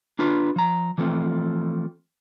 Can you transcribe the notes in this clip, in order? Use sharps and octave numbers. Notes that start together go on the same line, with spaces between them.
D4 F4 B4
F3 A#5
E3 F3 A3 C4